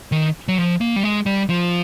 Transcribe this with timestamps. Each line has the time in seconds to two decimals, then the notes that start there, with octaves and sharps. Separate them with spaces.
0.12 D#3
0.48 F#3
0.58 F3
0.81 A#3
0.96 G3
1.03 G#3
1.26 G3
1.49 F3